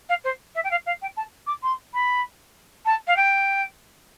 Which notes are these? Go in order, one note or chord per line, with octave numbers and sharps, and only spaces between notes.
F5
C5
E5
G5
F5
F5
G5
A5
D6
C6
B5
A5
F5
G5